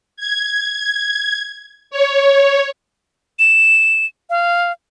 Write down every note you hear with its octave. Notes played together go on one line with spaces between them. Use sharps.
G#6
C#5
E7
F5